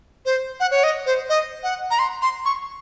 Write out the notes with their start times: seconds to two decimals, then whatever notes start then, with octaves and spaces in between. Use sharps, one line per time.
0.26 C5
0.60 F#5
0.71 C#5
0.84 D#5
1.06 C5
1.29 D#5
1.63 F#5
1.91 A#5
1.99 C6
2.22 C6
2.45 C#6